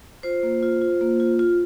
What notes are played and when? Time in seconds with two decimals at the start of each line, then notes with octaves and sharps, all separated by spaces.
0.23 F4 C5
0.43 A#3
0.63 F4
0.81 F4
1.01 A#3
1.20 F4
1.39 F4